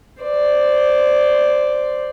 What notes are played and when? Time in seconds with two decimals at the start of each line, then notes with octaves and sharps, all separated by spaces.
0.23 C5 D5